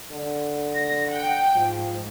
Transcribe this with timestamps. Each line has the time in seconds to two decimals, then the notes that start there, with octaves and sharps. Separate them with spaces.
0.12 D3
0.74 A#6
1.09 F#5 G5
1.56 G#2 F3